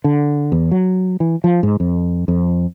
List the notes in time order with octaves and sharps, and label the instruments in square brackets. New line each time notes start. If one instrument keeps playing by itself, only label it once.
[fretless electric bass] D3
E2
F#3
E3
F3
G#2
F2
F2